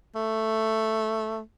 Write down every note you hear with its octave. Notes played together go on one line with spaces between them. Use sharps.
A3